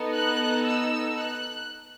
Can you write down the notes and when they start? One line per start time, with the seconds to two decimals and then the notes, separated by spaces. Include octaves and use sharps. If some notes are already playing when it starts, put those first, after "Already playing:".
Already playing: B3 D#4 A4
0.14 F#6
0.65 E6
1.17 F#6